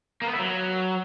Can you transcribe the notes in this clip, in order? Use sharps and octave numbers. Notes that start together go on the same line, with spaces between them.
A#3
B3
E4
F#3